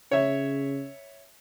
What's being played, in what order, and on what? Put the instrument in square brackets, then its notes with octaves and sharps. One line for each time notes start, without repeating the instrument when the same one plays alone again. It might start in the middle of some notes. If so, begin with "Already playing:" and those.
[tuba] C#3 [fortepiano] C#5 E5